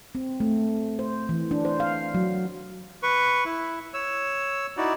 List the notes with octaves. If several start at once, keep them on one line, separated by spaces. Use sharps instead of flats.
C4
A3
C5
E3
D4
C5
F5
F#3
B4 C#6
E4
C#5 E6
D#4 E4 F#4 D5